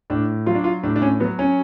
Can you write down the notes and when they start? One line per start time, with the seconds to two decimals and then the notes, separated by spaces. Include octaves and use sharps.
0.10 A2 D4
0.46 F#3 F4
0.55 D4
0.64 F4
0.83 A2 D4
0.96 D4
1.02 C#4
1.20 F#3 B3
1.39 C#4